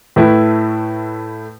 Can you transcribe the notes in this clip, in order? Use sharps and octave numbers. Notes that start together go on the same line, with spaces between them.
A2 A3 E4 B4